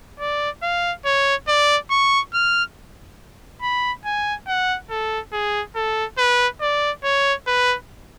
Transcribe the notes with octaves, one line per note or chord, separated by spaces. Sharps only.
D5
F5
C#5
D5
C#6
F6
B5
G#5
F#5
A4
G#4
A4
B4
D5
C#5
B4